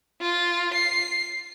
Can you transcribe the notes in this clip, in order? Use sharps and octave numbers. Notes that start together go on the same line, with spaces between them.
F4
C7